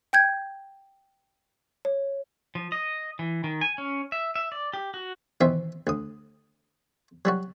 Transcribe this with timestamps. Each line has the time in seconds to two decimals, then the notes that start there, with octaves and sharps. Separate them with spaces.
0.13 G5 G6 G#6
1.85 C#5
2.55 F3
2.72 D#5
3.19 E3
3.44 D#3
3.61 G#5
3.78 C#4
4.12 E5
4.36 E5
4.52 D5
4.73 G4
4.94 F#4
5.41 B2 D#3 E3 C4 E5
5.87 D2 D#6
7.25 F#3 G3 F#4